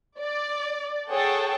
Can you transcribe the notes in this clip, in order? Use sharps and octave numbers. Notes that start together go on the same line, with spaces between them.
D5
G#4 A4 C#5 F#5 G5 A5